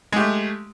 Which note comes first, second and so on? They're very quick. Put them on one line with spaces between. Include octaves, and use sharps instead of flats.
G#3 G4 A3